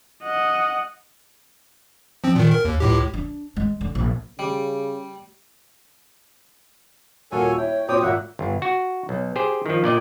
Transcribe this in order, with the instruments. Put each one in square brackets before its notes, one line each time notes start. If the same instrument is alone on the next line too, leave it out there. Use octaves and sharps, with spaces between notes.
[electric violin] D#5 F#5
[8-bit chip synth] F3 C4
A#2 D#3
A#4
D#2
C#2 A2 G4
[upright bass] D4
G#3
D3
A#1
[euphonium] C#3 [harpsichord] G3
[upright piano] D#1 F4 F#4 [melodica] A4 C#5 G#5 [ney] A#4
[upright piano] E4 [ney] C#5 [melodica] G5
[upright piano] A#2 C#5 D6 [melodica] C4 G5 D#6 [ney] F#4
[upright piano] G#1 [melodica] A#3 E5 F#5 [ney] F4
[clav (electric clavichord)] G1
F#4
B1
G4 G#4 C5
D#3 F3
A#2 D5 D#5 G5